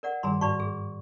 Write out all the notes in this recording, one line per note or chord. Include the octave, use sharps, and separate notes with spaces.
A#4 D5 F#5
G2 D#3 G3 G#4 A#5 C6
G#2 D5 B5 C#6
G#4